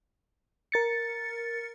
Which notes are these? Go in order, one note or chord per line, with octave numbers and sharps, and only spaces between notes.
A#4 A6 C#7